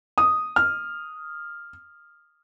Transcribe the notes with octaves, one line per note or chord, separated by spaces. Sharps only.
D#6
F6